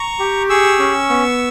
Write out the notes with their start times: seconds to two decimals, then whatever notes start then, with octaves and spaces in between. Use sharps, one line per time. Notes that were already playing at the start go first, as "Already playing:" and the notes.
Already playing: A#5 C#6
0.19 G4
0.49 G#4 C#6 E6
0.79 C#4
1.09 B3